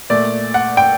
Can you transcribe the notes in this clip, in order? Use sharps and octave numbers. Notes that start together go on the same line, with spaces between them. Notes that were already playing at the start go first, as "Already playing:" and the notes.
A#2 A3 D5
F#5
G5